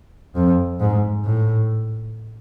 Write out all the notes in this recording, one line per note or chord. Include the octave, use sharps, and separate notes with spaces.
F2
G#2
A2